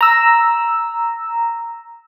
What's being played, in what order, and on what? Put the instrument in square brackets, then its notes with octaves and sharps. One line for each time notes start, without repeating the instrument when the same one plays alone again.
[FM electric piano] A#5 E6